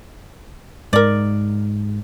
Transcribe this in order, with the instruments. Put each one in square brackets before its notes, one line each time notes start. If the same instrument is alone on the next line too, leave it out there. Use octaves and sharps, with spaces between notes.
[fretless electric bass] G#2 [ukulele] A#4 D5